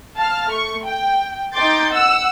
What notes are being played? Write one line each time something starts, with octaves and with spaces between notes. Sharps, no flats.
F5 A5 F6
A3 C#6
G5
D#4 G5 C6 D6 G6 A6
F#5 E6